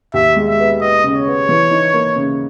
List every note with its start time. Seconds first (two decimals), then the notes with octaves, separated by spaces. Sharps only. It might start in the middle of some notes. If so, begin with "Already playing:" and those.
0.13 D#2 E5
0.36 G#3
0.48 E5
0.59 B3
0.81 B3 D#5
1.04 C#3
1.15 C#5
1.26 B3
1.49 E3
1.71 D#4
1.94 A#3
2.16 C#3